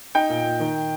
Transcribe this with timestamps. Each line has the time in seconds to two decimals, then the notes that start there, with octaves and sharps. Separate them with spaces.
0.15 D#4 G5
0.30 A#2
0.44 A#2
0.60 D#3